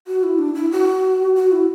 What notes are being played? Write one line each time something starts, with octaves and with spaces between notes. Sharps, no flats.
F#4
E4
D4
E4
F#4
F#4
E4